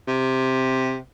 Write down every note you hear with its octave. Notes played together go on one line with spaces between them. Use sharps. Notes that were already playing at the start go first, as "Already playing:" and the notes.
C3